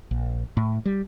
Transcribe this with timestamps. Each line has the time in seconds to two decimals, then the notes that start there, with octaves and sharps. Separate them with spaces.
0.11 A#1
0.57 A2
0.86 G3